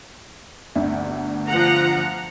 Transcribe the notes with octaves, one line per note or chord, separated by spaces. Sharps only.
G1 D2 E5
F3 F#5 A#5